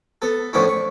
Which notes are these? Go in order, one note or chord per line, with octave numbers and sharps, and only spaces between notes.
B3 A4
A2 D3 F3 B3 C#4 E4
C#6